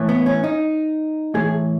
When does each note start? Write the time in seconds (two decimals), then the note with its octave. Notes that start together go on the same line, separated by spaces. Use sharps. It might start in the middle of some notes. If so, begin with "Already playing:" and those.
Already playing: A2 E3
0.09 B3
0.26 C#4
0.44 D#4
1.34 A2 E3 G#4